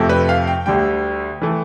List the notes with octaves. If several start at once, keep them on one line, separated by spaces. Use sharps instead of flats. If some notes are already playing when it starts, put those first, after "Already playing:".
Already playing: F2 C3 F3 A3
B4
F5
G5
D2 D3 G3 G5
E3 A3